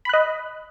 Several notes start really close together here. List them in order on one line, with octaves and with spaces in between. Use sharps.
B5 F#6 D#5